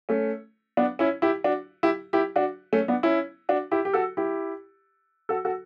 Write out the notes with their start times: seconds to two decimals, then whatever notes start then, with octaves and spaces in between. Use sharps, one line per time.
0.09 A3 C#4
0.77 B3 D4
0.99 C#4 E4
1.22 E4 G4
1.44 D4 F#4
1.83 E4 G4
2.13 E4 G4
2.36 D4 F#4
2.73 A3 C#4
2.88 B3 D4
3.03 C#4 E4
3.49 D4 F#4
3.71 E4 G4
3.85 G4
3.94 F#4 A4
4.17 E4 G4
5.29 F#4 A4
5.45 F#4 A4